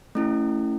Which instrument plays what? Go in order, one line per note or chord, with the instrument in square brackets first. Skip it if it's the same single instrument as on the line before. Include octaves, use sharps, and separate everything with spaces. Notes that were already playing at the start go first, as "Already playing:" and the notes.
[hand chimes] A3 C#4 E4